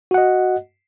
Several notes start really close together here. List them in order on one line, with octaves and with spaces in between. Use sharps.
F#4 F#5 D#5